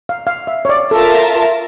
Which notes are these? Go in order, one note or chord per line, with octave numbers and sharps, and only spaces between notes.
F5
F5
E5
C#5
D5
F4 A4 A#4 E5 A5